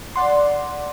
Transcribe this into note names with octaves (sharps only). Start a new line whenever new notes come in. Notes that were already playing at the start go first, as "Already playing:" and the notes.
D5 F#5 C6